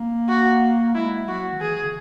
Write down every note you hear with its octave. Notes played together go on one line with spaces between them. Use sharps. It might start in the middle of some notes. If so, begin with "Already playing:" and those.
Already playing: A#3
F#4
G#3 E4
F#3 F#4
D#3
E3 G#4
C#3